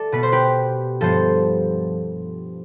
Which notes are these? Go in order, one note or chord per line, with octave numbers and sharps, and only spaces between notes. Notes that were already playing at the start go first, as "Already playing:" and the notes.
Already playing: A3 A4 D5
B2 B3 B4
C5
G4 B4
G2 F3 B3 A4 C5